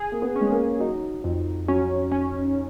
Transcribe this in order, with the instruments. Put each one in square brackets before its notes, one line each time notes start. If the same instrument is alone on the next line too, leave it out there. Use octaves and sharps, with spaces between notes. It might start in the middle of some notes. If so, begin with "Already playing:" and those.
Already playing: [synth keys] G#4
[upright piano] A#3
B3
[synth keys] C#4
[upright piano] G#3
A#3
[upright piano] F#3 [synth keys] D#4
[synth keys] F2
[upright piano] F#3 [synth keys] C#4
[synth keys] C#4